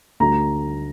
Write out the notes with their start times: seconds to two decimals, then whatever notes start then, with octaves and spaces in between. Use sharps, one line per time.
0.20 D2 A#5